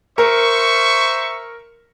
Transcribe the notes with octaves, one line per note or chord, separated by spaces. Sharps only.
A#4 C5 E5 C#6